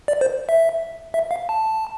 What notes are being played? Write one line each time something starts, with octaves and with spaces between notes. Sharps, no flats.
D5
C5
E5
E5
F5
A5